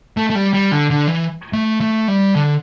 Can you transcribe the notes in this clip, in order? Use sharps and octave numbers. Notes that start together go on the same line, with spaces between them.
A3
A3
G3
G3
D3
D3
E3
A3
A3
G3
D3